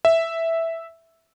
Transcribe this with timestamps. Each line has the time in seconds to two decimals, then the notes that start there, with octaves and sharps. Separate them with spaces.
0.05 E5